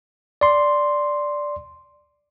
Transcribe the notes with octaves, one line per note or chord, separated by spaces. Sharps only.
D5 C6